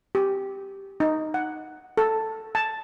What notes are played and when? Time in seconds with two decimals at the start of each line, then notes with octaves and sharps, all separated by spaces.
0.15 G4
1.00 D#4
1.34 F#5
1.97 A4
2.55 A5